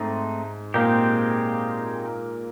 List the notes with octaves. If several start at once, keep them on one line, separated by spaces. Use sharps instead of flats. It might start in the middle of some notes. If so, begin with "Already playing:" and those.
Already playing: G#2 A3 C4 D#4
A#2 G#3 A#3 C4 D#4 G4